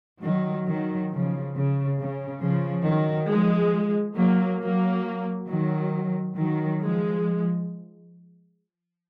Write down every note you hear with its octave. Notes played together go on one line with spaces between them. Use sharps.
D#3 F#3
D#3 F#3
C#3 F3
C#3
C#3
C#3 F3
D#3 F#3
F3 G#3
F#3 A#3
F#3 A#3
D#3 F#3
D#3 F#3
F3 G#3